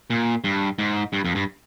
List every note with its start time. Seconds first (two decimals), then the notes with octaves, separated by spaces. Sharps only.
0.10 A#2
0.44 G2
0.79 G#2
1.13 G2
1.25 F2
1.35 G2